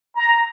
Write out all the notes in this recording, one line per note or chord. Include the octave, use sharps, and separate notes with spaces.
A#5